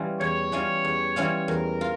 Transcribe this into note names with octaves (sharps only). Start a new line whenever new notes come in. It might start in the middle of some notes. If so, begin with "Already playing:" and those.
Already playing: E3 G3 C#4 F4
E2 C#5
E3 G3 C#4 F4
E2
E3 G3 C#4 F4
E2 A#4
F4